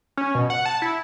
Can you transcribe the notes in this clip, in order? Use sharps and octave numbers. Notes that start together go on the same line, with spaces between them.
C#4
B2
F#5
A5
E4